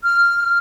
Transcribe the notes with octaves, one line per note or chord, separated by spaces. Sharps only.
F6